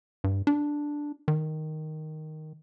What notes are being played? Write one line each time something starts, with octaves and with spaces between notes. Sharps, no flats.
G2
D4
D#3